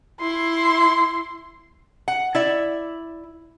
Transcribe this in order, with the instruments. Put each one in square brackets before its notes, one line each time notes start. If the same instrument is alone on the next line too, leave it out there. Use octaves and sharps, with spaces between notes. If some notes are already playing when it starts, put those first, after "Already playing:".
[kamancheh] E4 C6
[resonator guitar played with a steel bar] F#5
E4 D5 E5